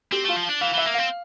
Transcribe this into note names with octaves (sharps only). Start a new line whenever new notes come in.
C4 G4
A3 F4
F3
D4
E3 F5
E3 E5
A#3
C4 F5